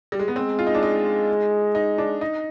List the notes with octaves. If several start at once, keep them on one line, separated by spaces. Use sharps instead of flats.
G3
G#3
B3
G#3 C4
F4
D#4
D4
D#4
D#4
D4
D#4